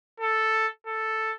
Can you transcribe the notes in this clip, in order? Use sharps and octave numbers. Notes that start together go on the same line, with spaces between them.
A4
A4